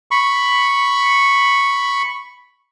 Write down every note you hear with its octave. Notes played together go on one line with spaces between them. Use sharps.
B5 C#6